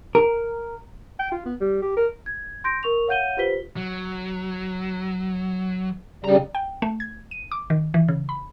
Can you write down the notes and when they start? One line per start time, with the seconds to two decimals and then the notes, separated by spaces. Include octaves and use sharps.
0.15 A#4
1.19 G5
1.32 F4
1.45 B3
1.61 G3
1.82 G4
1.97 A#4
2.26 G#6
2.64 C6 G6 A#6 D7
2.83 A#4 C#6 F7
3.08 C#5 F5 F#5 G6 D#7 G7
3.37 F4 G4 B4 C5 B6 G7
3.77 F#3
6.24 C#3 G3 D4 A#5
6.55 G5
6.82 A3
7.00 G#6
7.31 D#7
7.52 D6
7.70 D#3
7.94 E3
8.08 C#3
8.29 B5